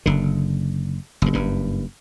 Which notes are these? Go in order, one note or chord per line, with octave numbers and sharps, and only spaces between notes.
F#1 D3
F#1 G2
F#1 G2